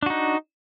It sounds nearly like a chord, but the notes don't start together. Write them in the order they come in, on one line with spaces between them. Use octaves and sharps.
D4 F#4 D#4